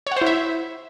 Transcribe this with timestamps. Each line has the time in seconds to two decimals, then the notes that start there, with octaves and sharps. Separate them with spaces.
0.07 C#5
0.11 F#5
0.16 C5
0.21 E4
0.26 E5